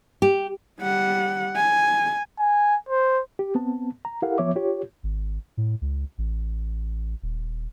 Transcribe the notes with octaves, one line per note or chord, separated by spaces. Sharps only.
G4
G3 F#5
G#5
G#5
C5
G4
B3 C4 A5
A#5
E4 G4 A4 A#4 F5 F#5
F3 B3 C#5 E5 D6
F4 G4 C#5
G#1
A2
C#2
A1
D#1